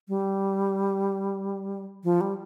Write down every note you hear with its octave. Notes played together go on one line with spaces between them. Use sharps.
G3
F3
G3